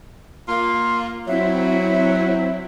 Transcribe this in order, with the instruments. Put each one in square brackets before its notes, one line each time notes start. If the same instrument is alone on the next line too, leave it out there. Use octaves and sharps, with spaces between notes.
[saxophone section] A#3 F4
[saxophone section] F#3 [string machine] C4 E4 [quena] E5